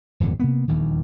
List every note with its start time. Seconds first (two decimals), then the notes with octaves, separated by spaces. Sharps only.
0.20 D#1 G#1 F2 D3
0.40 C3 A#3 B3
0.68 D#1 A#1 E2 D#3